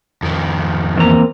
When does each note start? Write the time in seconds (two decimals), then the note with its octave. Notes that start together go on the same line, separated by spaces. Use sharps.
0.22 F2 D#3
0.97 E2 A#3 C4 A#5